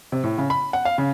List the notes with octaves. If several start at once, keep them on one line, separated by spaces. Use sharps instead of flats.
C3
A2
C#3
B5
F#5
F5
C#3